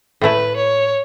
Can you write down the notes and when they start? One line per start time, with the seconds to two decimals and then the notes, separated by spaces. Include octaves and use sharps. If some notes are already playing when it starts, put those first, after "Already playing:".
0.21 A2 A3 E4 B4
0.56 C#5